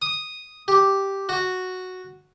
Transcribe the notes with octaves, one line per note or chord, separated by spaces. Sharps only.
D#6
G4
F#4